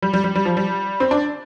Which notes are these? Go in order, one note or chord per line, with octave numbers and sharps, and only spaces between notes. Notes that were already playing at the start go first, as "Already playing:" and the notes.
G3
G3
G3
G3
F3
G3
C4
D4